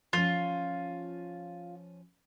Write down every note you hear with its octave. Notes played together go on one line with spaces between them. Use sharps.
F3 C#4 F4